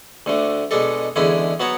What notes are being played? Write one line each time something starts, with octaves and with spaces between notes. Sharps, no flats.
D2 D3 A3
B2 G#3 D4 A4
E2 D3 G#3 C#4 E4
F#3 B3 F#4 C#5